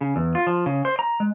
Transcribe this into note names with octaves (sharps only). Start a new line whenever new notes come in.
C#3
E2
F4
F3
C#3
C5
A#5
G#3